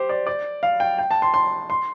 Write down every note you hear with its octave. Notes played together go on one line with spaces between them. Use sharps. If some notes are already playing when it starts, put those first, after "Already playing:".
Already playing: G4 C5
D5
D5
F5
G5
G5
A5
C6
C6
C6